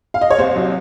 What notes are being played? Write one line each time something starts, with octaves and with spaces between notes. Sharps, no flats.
F5
D#5
C#5
C2 C5
F#3